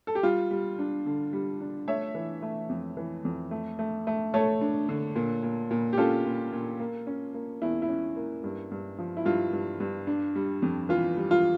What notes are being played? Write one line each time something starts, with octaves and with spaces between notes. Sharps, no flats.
A4
G4
G3 F4
G3
D4
D3
G3
D4
A3 C#5 E5
E3
A3
F2
E3
F2
A3
A3
A3
A3 A4 C#5
D4
D3
A#2
A#2
A#2
G4
C#4 F4 A4
A#2
A#2
A#3
C#4
A#3
E2 E4
E4
C#4
A#3
G2
G2
F3
E4
G2 F4
G2
G2
D4
G3
F2
E3 F4
G3
F4